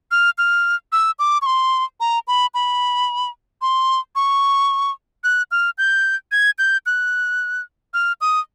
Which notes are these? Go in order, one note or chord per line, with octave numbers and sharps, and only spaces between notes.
F6
F6
E6
D6
C#6
C6
A#5
B5
B5
C6
C#6
F#6
F6
G6
G#6
G6
F#6
F6
D#6